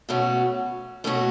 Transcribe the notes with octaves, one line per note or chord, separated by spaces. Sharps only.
B2 A3 C#4 F#4
B2 A3 C#4 F#4